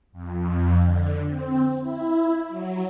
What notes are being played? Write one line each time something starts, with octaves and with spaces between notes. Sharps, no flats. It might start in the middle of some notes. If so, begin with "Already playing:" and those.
F2
D3
C4
E4
F#3